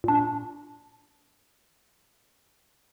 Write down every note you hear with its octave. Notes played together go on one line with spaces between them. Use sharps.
A#2 D4